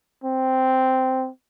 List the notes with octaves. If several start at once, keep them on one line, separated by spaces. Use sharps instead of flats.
C4